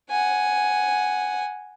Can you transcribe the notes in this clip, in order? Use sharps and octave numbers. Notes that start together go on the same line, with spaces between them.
F#5 G#5